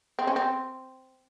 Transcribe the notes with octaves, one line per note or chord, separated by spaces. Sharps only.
C4
C#4
C4